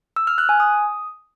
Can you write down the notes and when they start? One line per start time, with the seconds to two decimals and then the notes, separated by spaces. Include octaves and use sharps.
0.16 E6
0.27 F6
0.38 F#6
0.49 G#5
0.60 D#6